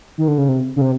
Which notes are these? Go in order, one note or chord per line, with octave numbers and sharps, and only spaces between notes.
D#3
D3
C#3
C3
C#3
C3